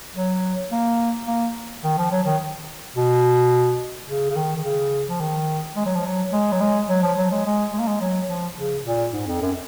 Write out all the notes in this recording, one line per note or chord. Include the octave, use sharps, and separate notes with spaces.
F#3
A#3
A#3
D#3
F3
F#3
D#3
B2
C#3
C#3
D#3
D#3
C#3
F3
D#3
G#3
F#3
F3
F#3
G#3
F#3
G#3
F#3
F3
F#3
G#3
G#3
G#3
A#3
G#3
F#3
F3
C#3
A#2
G#2
F2
F#2